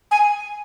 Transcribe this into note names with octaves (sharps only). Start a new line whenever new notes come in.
G#5